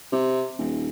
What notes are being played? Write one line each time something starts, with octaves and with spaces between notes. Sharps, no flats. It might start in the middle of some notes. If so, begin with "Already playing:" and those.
C3
D#1